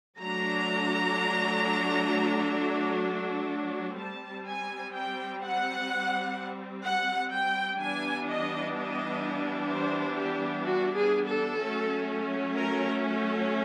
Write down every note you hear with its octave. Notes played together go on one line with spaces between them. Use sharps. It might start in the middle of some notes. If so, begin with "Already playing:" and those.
F#3 A3 D4 A#5
G3 C4 A5
G#5
G5
F#5
F#5
G5
E3 G3 B3 D4 G#5
D#5
D#5
C5
G4
F#4
G#4
A4
F#3 A3 C#4
A#4